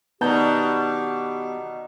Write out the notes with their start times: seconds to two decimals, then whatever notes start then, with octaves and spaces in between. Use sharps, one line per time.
0.21 B2 D#3 B3 D#4 G4 D5 A5 G6